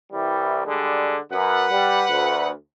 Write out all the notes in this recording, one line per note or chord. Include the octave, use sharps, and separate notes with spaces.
C2 E3 G3
D3 G3 G#3
F#2 B4 F#5
G3
D2